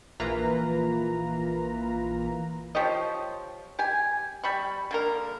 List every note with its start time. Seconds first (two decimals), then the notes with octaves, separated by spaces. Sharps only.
0.20 A#1 E3 A#3 F4 B4 A#5
2.75 F3 G4 C#5 D#5
3.79 G4 G#5
4.44 G3 B5 C#6
4.91 D3 A#3 A#4